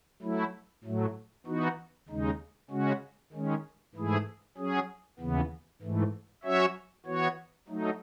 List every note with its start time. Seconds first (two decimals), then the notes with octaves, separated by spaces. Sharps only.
0.22 F#3 A3 E4
0.84 A2 F#3 A3
1.46 E3 B3 D#4 F#4
2.08 D#2 C#3 G#3 D#4
2.71 C#3 G#3 C#4 F#4
3.33 D#3 G#3 C#4
3.95 G#2 E3 A3 E4 G#4
4.57 F#3 C#4 G#4
5.19 D#2 C#3 E3 B3
5.82 G#2 E3 A3
6.44 F#3 C#4 F#4 C#5 E5
7.06 E3 B3 F#4 C#5
7.68 F#3 A3 D#4